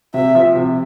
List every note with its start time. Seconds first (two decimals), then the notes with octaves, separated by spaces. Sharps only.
0.14 C3 E5
0.35 F3
0.55 C3